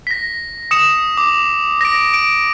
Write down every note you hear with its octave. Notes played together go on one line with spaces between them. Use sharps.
A#6 B6
D#6 C#7 E7
D6
A#6 D7
D7